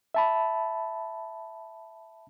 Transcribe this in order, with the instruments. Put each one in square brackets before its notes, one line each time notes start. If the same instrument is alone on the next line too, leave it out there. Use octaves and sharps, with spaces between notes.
[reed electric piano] E5 A5 B5